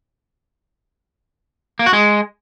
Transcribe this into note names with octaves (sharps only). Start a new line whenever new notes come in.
A#3
F#4
G#3